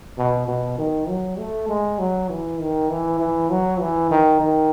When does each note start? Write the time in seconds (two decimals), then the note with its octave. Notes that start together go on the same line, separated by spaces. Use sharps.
0.18 B2
0.48 B2
0.79 D#3
1.09 F#3
1.39 A3
1.69 G#3
1.99 F#3
2.30 E3
2.60 D#3
2.90 E3
3.20 E3
3.50 F#3
3.81 E3
4.11 D#3
4.41 D#3